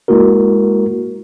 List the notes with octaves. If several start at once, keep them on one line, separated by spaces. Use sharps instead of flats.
G#3 A#3 E4 F#4 A#4